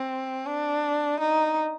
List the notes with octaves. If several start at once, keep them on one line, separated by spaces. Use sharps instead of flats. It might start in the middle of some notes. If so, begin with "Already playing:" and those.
Already playing: C4
D4
D#4